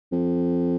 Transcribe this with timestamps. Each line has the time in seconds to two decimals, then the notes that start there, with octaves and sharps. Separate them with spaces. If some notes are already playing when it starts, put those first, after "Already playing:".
0.12 F2